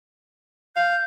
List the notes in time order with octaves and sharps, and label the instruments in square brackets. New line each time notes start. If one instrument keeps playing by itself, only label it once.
[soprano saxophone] F5 [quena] G6